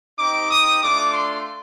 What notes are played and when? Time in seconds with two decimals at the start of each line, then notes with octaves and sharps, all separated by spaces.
0.18 C4 D#4 G4 D6
0.50 D#6
0.82 A3 D4 F4 D6
1.13 C6